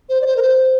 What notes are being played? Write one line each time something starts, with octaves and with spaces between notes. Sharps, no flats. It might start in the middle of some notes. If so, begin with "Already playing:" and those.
C5
D5
C5
A#4
C5